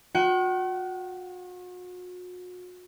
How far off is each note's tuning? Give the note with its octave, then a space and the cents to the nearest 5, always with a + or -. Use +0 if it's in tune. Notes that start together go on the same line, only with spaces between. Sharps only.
F#4 -40 F#5 +40